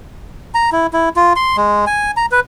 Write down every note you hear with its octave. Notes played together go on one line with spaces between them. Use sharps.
A#5
E4
E4
F4
C6
G#3
G#5
A#5
B4